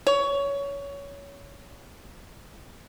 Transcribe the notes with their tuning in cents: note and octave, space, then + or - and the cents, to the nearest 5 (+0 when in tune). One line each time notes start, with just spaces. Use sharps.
C#5 +20